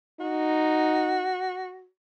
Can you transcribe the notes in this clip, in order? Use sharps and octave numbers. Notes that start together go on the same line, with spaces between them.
D#4 F#4